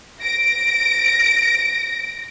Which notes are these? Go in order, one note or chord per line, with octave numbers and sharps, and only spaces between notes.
A#6 D7